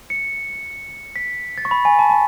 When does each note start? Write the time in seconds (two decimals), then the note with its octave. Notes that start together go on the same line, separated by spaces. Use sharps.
0.10 C#7
1.16 B6
1.58 A6
1.65 C#6
1.71 B5
1.85 G#5
1.99 A5
2.09 A5